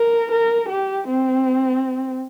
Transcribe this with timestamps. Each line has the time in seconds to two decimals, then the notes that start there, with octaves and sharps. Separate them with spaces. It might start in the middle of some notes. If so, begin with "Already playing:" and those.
Already playing: A#4
0.32 A#4
0.69 G4
1.08 C4